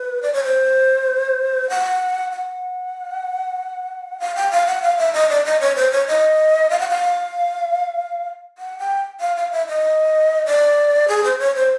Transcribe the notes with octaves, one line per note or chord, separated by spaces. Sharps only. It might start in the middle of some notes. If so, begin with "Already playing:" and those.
Already playing: B4
D5
C#5
C5
F#5
F#5
F5
G5
F5
F#5
F5
E5
D#5
D5
D#5
C#5
C5
C#5
D#5
F5
F#5
F5
F#5
G5
F5
F5
E5
D#5
D5
G#4
C5
C#5
C5